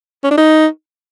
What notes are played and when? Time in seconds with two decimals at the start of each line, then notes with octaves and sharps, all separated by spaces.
0.24 C#4
0.31 D4
0.38 D#4